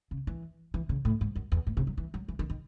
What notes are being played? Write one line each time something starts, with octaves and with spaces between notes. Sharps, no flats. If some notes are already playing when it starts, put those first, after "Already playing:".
C#3
E3
E3
C#3
A2
G#2
F#2
E2
A2
C3
F#3
E3
F#3
E3
D#3
D#3